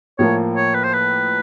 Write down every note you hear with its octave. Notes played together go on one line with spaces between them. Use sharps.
A2 F3 A#3 C#5
C#5
B4
C5
B4